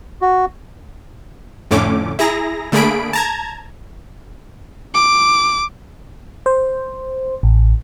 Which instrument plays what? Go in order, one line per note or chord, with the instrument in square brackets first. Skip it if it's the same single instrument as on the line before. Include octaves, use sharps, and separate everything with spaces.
[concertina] F#4
[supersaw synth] F2 A2 D3 A3 C#4 D6
E4 G#4 A#5 A#6
D3 A3 A#3 G#4 B5 D7
A5 A#5 G#6
[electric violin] D6
[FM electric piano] C5
A1